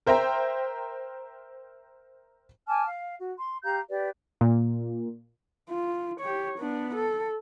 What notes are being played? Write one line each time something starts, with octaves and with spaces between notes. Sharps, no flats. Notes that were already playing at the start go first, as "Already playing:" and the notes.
A#4 C5 E5 G5 A#5
G#5 A5 D6 F6
F5
F#4
C6
G4 F5 A#5 G6
G4 B4 D5
A#2
F4
G4 C#5
B3 D4
A4